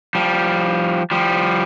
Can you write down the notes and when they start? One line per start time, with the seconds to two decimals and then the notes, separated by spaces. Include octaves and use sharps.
0.15 F3 G3
1.11 F3 G3